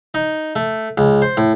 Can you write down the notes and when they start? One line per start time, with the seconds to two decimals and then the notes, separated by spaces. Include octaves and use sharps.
0.14 D#4
0.56 A3
0.98 C#2
1.22 C5
1.37 A2